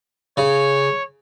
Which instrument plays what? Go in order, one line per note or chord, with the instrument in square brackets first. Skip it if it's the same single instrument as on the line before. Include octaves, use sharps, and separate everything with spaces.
[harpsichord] C#3 [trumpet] C#5